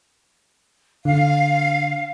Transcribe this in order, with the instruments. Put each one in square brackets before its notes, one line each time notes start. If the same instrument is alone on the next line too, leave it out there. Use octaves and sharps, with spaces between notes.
[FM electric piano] D3 [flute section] F5